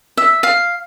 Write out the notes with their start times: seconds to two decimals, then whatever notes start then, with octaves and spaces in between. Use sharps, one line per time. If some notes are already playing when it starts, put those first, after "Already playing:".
0.17 E5
0.43 F5